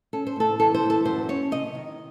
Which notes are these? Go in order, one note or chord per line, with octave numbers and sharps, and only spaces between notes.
C#4 A4
C5
A2 A4
E3 A4
C5
E3
A4
F#2 C5
C#4 C#5
C3 D#5
D#3